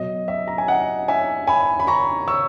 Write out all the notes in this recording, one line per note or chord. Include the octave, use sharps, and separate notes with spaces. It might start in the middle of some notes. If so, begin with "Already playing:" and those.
Already playing: B2 F#3 D#5
E5
A#5
G#5
D#5 F#5
E5 G#5
G#5 B5
B5
A#5 C#6
C#6 E6